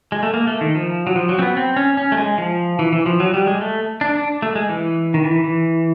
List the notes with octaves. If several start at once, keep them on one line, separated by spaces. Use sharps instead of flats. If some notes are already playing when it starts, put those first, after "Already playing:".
G#3
A3
A#3
A3
D#3
F3
F#3
F3
F#3
C4
B3
C4
C#4
C#4
A3
G#3
F3
E3
E3
F3
F#3
G3
G#3
A3
D4
D4
A3
G#3
E3
D#3
E3
E3